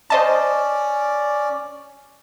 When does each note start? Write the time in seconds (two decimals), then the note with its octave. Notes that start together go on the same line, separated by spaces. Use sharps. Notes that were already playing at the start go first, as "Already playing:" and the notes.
0.10 C#4 C5 D5 D#5 A5